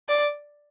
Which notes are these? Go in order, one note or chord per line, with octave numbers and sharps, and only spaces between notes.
D5